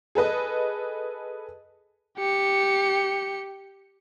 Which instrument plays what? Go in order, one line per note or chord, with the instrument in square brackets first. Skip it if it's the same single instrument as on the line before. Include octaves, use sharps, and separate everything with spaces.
[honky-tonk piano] G#4 A4 B4 D#5
[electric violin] G4 C#7